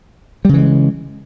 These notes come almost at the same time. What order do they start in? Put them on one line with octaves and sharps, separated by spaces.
G3 C#3 E3 G#3